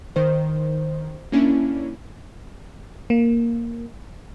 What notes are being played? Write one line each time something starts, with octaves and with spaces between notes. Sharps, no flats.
D#3 C5
A#3 C#4 D4 E4
A#3